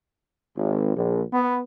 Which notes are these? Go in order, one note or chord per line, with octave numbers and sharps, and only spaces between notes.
G#1
A#1
B3